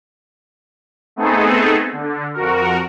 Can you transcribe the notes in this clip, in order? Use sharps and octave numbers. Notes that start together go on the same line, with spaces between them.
A3 B3 C4 D#4 G#4 A4
D3
F2 F#4 A#4